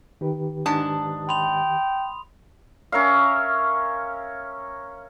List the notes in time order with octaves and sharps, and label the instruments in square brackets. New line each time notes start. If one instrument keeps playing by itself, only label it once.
[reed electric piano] D#3 G4 B4
[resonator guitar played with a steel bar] G#2 D4 A5 [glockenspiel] D#6
[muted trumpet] G5 [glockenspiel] B5 C6 F7
[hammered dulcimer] C#4 A#4 E5 F5